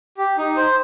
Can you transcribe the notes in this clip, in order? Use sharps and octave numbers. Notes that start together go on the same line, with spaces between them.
G4
D#4
C5